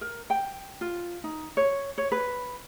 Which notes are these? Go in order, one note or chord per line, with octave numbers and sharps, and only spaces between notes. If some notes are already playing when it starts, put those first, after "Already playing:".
A#4
G5
F4
D#4
C#5
C#5
B4